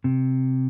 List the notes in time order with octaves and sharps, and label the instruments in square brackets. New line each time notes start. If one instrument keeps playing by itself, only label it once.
[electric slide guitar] C3